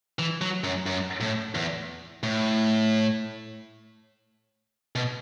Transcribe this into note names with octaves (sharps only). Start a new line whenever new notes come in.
E3
F#3
F#2
F#2
A2
E2
A2
B2